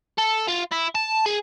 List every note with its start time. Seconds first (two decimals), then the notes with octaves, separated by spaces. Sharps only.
0.18 A4
0.47 F4
0.71 E4
0.95 A5
1.26 G#4